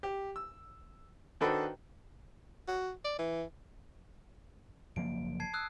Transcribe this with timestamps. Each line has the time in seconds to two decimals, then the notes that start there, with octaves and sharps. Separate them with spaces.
0.03 G4
0.36 E6
1.41 D#3 D4 F#4 A4 B4 C5
2.68 F#4
3.05 D5
3.19 E3
4.96 F#1 F3 A#3 D7
5.40 A5 G#6 C7
5.54 D#6 E6 F#6